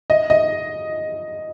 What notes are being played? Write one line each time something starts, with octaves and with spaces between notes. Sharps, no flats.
D#5
D#5